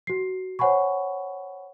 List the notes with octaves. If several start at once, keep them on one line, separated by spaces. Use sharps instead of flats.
F#4 C7
C5 C#5 F#5 G#5 B5 C#6